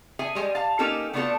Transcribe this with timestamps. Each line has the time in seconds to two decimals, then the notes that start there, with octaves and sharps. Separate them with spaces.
0.19 G#4 A4 E5 G#5
0.35 G3 G#3 G#5
0.55 F5 A5
0.79 A#3 C#4 D#4 G4 A4 A#4
1.13 A3 B3 D4 F4 F#4 A4